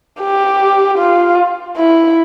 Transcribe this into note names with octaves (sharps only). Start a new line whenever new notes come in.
G4
F4
E4